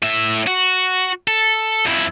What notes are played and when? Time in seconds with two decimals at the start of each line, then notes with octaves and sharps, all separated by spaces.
0.03 A2 E5
0.47 F#4
1.28 A4
1.85 F2 E4